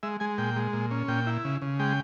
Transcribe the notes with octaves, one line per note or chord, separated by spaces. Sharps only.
G#3 E5
G#3 G#5
A#2 G5
G#3
A#2
C#4
A#2 G5
E4
C#3
C#3
G#3 G5